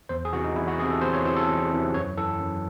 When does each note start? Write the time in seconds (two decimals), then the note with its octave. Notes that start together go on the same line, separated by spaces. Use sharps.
0.09 E2 C5
0.25 G#4
0.33 C3 E3 F#4
0.44 D#4
0.56 E2 E4
0.67 F#4
0.79 E3 G#4
0.82 C3
0.91 A4
1.02 E2 C5
1.14 C#5
1.25 C3 E3 C5
1.36 A4
1.48 E2
1.71 C3 E3
1.94 F#2 C#5
2.17 E3 A4
2.41 F#2